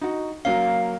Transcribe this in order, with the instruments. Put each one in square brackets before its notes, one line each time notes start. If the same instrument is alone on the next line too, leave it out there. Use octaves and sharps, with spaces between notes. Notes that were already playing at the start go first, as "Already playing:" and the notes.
[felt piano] D#4 F#4
[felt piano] F#3 A#3 C#4 [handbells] F5